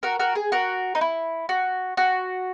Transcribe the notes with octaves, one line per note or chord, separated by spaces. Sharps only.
F#4 A#4
F#4 A#4
G#4
F#4 A#4
D#4
E4
F#4
F#4